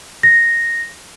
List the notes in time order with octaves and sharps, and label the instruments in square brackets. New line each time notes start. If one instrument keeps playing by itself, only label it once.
[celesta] A#6